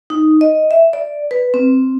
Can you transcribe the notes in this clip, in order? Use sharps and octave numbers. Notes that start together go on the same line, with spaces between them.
D#4
D#5
E5
D5
B4
C4